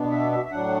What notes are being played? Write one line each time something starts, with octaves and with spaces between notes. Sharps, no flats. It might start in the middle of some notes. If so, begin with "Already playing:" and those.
Already playing: B2 B3 D4
E5
E5
E5
A2 F#3 D4 F#5